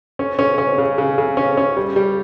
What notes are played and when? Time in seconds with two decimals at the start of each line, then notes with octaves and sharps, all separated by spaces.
0.19 C#4
0.39 C#4
0.58 C#4
0.78 C#3
0.98 C#3
1.18 C#3
1.37 C#4
1.57 C#4
1.77 G3
1.96 G3